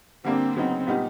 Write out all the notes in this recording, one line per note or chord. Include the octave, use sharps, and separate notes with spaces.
D3 G3 A#3 C4 D4
C#3 F#3 B3 C4 D#4
A#2 G3 B3 D#4 G4